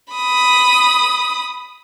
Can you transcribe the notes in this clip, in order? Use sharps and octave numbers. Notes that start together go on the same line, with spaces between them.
B5 D#6